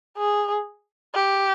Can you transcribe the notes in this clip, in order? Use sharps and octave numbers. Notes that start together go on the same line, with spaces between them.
G#4
G4